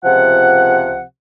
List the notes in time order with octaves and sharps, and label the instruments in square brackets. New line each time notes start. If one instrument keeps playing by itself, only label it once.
[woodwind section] C#2 C3 F3 F#5